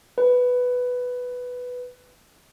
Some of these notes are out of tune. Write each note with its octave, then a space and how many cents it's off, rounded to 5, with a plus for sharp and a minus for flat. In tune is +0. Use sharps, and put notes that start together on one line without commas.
B4 +5